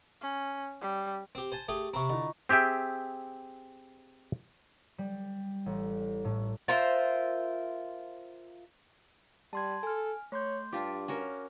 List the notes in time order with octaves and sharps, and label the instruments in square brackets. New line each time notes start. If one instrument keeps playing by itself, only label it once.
[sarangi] C#4
G3
[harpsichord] C4 G4
C5 G#5 A5
A3 G4 G#4
[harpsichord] C3 C4 [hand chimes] A#5 B5 C#6
[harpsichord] D3 [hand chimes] E4 F4 D#5
[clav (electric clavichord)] C4 G4 G#4 E5 G5
[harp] G3
A1
A2
[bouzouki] F4 A#4 C5 E5
[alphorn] G3 [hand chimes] A5 C6 G#6
[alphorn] A4 [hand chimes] G#5 F6
[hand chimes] A3 C6 G6 [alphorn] C#5
[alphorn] G2 [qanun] D4 F4 G4 [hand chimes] D6
[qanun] C#4 F#4 A#4